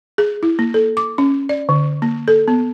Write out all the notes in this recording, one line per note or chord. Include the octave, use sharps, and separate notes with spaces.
G#4
E4
A#3
A4
D6
C#4
D5
D3
A#3
A4
B3